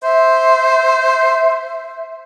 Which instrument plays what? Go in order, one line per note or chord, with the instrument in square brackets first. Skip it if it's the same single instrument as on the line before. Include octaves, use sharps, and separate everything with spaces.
[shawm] C5 [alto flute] E5